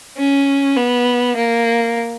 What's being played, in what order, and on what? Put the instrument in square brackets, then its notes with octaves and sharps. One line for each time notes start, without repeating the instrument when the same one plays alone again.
[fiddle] C#4
B3
A#3